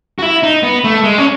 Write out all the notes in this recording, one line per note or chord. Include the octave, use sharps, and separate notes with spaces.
F#4
E4
D#4
B3
A3
G#3
C#4